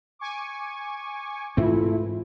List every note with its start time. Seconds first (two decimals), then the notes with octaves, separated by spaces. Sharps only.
0.19 G#5 C#6 D6
1.57 G#2 E3 A3 C4 E4 F4